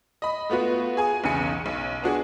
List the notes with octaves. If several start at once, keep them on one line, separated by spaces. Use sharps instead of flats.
D#5 B5
A3 B3 F4 F#4 B4
G#4 G#5
B1 E2 C#3 G#5 C#7
B1
B3 D4 F#4 G#4